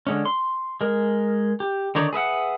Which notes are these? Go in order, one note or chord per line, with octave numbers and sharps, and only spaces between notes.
D3 G#3 C#4
C6
G#3 A#4
G4
D3 D#3 D#4 C#5 D5
G#4 B4 E5 F#5